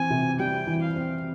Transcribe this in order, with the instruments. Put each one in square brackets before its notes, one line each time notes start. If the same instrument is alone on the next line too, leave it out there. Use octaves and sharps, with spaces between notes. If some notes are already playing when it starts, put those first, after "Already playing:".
Already playing: [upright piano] E3 C4 [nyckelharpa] G#5
[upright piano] C3
[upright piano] G3 [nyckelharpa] G5
[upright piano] E3
[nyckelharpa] F5
[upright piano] C4